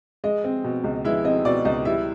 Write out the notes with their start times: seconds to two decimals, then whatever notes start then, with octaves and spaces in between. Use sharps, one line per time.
0.24 G#3 D#5
0.44 C4
0.64 B2
0.84 C#2
1.05 G#3 E4 E5
1.24 C4 D#5
1.45 B2 D5
1.65 C#2 D#5
1.85 G3 E4 E5